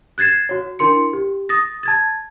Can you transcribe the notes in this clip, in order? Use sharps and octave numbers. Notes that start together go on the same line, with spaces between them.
F#6 G#6 A6 C7 E7
F#4 C#5
D4 E4 A#4 C6 C#7
G4
D#6 A6 A#6
A5 G#6 A6